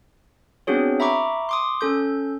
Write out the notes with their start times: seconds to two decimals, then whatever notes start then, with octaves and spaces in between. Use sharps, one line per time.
0.67 B3 C4 D4 F#4 G#4 C#5
1.00 E5 A#5 B5 C#6 D6
1.49 C6 D6 D#6
1.81 C#4 A4 G6